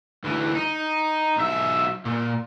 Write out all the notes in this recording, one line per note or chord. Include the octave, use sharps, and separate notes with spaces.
D2 E3
D#4
B1 E5
A#2